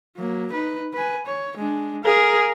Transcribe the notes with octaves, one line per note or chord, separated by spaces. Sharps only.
F#3 A#3
D#4 B4
B4 G#5
C#5
G#3 D4
G#4 A#4 F5